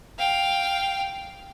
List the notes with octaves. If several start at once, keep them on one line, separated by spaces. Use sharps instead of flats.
F5 G5